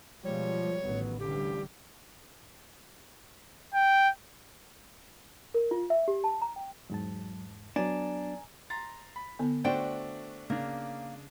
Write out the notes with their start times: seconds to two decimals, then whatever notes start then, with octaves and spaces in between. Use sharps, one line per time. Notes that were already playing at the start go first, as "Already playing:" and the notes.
0.24 B2 F3 G3 G#3 C#5
0.83 A1 D#3 F#3 B3
1.20 A1 D2 G2 D3 G3 G4
3.74 G5
5.54 A#4
5.71 F4
5.90 E5
6.08 G4
6.24 A5
6.42 A#5
6.56 G5
6.90 E2 G#2 F#3 A5
7.76 F#3 B3 D4 G#5 A#5
8.70 A#5 C6 A6
9.16 B5
9.39 D3 B3
9.64 A3 D4 F#4 C5 D5 G5
10.50 C#3 A#3 D4